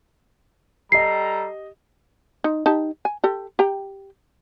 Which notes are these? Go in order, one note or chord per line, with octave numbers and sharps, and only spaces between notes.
G3 G4 A4 D#5 A#5 C7
D#4
D#4 G4 A5
G#5
G4 A4
G4 G5 A#5